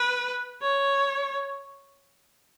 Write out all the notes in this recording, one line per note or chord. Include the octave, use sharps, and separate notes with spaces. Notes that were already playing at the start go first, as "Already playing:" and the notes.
Already playing: B4
C#5